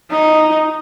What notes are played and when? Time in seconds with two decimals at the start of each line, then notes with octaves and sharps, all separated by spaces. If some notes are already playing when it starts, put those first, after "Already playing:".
0.11 D#4